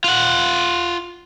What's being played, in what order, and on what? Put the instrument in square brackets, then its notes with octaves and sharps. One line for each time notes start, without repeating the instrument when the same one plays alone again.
[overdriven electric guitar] F4 F#5